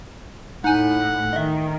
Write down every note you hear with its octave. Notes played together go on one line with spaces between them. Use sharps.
A2 D#4 F#5 G#5
D#3 D#5 E5